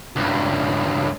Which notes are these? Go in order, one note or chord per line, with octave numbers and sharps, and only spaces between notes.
C#2 G2